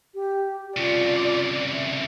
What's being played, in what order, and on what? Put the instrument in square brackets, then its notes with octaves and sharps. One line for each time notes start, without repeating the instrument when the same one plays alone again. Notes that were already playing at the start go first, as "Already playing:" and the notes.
[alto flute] G4
[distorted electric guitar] C2 C#3 [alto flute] F4 [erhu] D5
[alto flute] E5